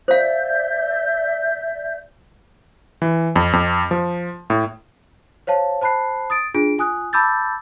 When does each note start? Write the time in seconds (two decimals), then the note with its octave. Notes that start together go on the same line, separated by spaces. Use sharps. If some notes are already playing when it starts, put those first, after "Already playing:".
0.08 C5 D5 E5 F5 G6
3.02 E3
3.36 F2
3.53 F2
3.91 F3
4.50 A2
5.47 C5 C#5 F5 A5
5.81 C5 A5 B5 F#6 C7
6.30 D#6 A6 D7
6.54 D4 F4 G#4 D7
6.78 F4 G#5 D#6 F#6
7.13 A5 B5 D6 E6 G6 A6